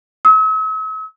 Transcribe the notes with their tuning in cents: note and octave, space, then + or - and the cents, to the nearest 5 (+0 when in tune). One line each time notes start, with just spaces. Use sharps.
E6 -45